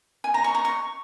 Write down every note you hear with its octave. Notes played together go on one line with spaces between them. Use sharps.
G#5
A#5
C#6
A#5
C#6